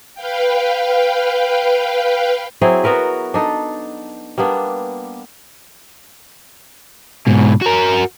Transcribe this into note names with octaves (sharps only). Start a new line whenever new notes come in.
B4 F5 G5
F#3 C4 E4 G#4
B3 F#4 A#4 B4
D4 D#4 A4
G3 A#3 B3 D4
G#2 B2
F#4 A#4